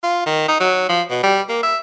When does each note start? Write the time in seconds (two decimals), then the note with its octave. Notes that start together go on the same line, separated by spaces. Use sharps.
0.03 F4
0.26 D#3
0.48 D#4
0.60 F#3
0.89 F3
1.10 B2
1.23 G3
1.49 A#3
1.63 E5